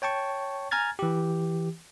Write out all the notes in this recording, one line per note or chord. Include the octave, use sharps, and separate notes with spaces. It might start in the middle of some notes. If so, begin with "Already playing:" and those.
C#5 G5 A5 C#6
G#5 A#5 F6 G#6 A6
E3 G4